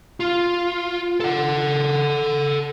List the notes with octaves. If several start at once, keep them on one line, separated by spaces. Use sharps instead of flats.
F4
A4 F#5